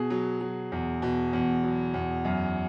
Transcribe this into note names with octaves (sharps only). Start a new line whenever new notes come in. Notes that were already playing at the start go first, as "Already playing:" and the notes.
Already playing: B2 G#4
F#3
F#3
E2
B2
E2
F#3
E2
F#2